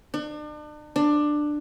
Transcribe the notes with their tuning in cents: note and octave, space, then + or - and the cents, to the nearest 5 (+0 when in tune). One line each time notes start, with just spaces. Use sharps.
D4 +40
D4 +15